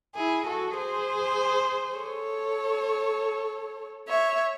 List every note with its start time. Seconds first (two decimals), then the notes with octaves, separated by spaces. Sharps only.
0.17 E4 G#4
0.47 F#4 A4
0.77 G#4 C5
1.97 A4 C#5
4.07 C#5 E5